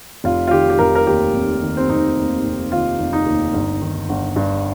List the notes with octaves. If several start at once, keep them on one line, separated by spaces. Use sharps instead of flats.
F1 F4
F4
D#3 G4
G4
F1 A#4
A#4
D#2 G4
F1
D#3
C4
F1 D#4
D#2
F1
D#3 F4
F1
D#4
D#2
G1
D#3
G1
G2